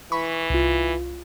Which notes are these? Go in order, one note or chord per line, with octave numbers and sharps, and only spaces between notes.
E3 B5 C#6 B6
C2 F4